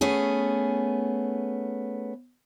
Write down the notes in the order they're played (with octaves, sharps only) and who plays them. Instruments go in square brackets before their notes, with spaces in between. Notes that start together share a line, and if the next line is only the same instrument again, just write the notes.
[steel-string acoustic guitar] A3 B3 C#4 G#4